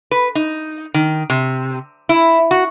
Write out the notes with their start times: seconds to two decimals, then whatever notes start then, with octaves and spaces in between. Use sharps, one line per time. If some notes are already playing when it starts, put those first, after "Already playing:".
0.11 B4
0.35 D#4
0.94 D#3
1.30 C3
2.09 E4
2.51 F#4